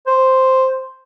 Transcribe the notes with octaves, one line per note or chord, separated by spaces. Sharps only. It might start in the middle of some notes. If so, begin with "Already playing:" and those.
C5